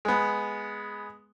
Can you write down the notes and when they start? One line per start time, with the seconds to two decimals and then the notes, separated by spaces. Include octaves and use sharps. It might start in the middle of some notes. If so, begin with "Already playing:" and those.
0.05 G#3 B3